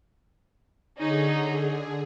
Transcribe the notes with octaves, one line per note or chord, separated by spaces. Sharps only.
D3 C#4 D#4 G#4